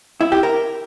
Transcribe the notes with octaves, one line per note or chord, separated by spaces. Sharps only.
E4
G4
A#4